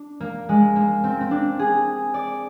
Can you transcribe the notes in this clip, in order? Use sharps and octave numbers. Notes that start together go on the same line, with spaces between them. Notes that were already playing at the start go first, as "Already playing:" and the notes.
Already playing: D4
A#3
G#3
A#3
C4
C4
D4
G#4
D5